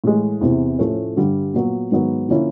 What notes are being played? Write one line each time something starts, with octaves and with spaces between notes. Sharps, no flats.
A2 E3 G#3
E2 C3 E3
A2 F3 A3 C#4
G2 D3 G3
A#2 F#3 B3
G#2 D#3 F#3 B3
D3 F3 A#3 C#4 E4